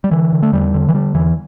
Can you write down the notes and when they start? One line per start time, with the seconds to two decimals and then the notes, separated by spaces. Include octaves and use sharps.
0.04 G3
0.11 D3 E3
0.32 D3
0.43 A3
0.52 E2 G3
0.74 D3
0.89 E3
0.94 D3 G3
1.14 E2 E3